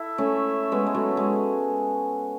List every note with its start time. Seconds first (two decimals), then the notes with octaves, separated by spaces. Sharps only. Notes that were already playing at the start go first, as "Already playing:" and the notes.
Already playing: E4 A4 E5
0.18 A3 C#4
0.72 G#3 B3
0.86 G#3
0.94 F#3 A3
1.17 G#3